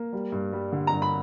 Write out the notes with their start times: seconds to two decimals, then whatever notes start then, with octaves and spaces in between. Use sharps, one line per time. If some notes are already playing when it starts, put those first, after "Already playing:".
Already playing: A#3
0.13 G3
0.32 G2
0.53 G3
0.72 D3
0.87 A#5
0.93 G2
1.02 B5